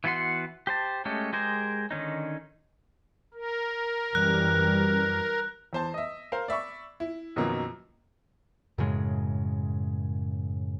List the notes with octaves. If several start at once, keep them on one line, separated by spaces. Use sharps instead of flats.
E3 B3 F#4 F#5 C6
G4 C5 A5
G#3 A3 C#4 G4 A4
G#3 G4 G#4 A#4 C5
D3 D#3 C#4 D#4
A#4
F#2 E3 G3 F#6
E2 C5 A5
D#5 E5
A#4 C5 F5
D5 E5 B5 C#6
E4
F#2 B2 D#3 F3 F#3 A#3
F#2 A2 C#3 G#3